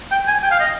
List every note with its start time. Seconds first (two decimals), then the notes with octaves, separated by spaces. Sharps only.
0.12 G5
0.28 G#5
0.43 G5
0.51 F5
0.60 D#5